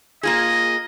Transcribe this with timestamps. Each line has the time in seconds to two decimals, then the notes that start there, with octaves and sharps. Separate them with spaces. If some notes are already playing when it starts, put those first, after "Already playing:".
0.23 A#3 F4 G#4 D#5